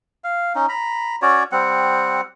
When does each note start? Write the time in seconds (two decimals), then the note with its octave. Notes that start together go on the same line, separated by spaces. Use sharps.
0.24 F5
0.55 C#4 D#4
0.69 A#5 B5
1.22 C#4 F#4 C#5 D5
1.52 G3 C4 F#5